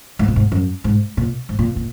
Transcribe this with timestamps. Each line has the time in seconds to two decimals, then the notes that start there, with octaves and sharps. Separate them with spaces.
0.19 G#2
0.28 A#2
0.36 G#2
0.52 F#2
0.84 G#2
1.17 A#2
1.49 G#2
1.59 A#2
1.76 A#2